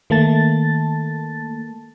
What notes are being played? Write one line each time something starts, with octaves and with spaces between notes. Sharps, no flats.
D#3 A3 A#3 A5 A6